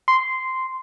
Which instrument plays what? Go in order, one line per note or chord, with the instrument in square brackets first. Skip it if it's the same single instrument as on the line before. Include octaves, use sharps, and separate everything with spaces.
[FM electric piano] C6